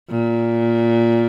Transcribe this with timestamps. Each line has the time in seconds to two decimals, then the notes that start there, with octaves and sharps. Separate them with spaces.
0.10 A#2